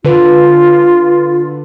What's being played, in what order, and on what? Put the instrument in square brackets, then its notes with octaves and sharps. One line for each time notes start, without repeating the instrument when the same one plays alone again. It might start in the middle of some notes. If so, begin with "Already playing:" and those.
[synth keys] D3 B4 [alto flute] F4